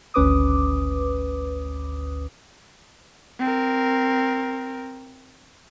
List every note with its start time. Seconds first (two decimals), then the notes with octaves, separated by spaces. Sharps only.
0.14 G#1 D2 C#4 B4 D6 D#6
3.40 C4 A#4